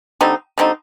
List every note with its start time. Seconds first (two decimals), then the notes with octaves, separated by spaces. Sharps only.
0.21 D3 G3 C4 D#4
0.58 D3 G3 C4 D#4